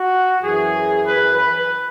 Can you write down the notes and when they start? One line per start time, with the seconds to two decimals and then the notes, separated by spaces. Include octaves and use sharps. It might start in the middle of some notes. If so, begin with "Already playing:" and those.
Already playing: F#4
0.42 F#2 E3 G#4
1.05 B4
1.37 B4